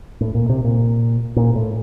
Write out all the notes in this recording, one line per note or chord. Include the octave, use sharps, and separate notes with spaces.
A2
A#2
C3
A#2
A#2
A2